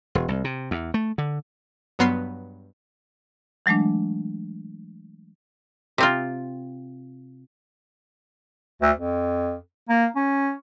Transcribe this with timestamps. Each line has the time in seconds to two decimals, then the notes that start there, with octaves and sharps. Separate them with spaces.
0.15 E1
0.28 C2
0.44 C3
0.71 E2
0.94 A3
1.18 D3
1.99 G2 F#3 B3 C6 F6 C7
3.66 E3 F#3 G#3 A3 D4
5.98 C3 C4 F4
8.82 D2
8.96 F2
9.89 A#3
10.16 C#4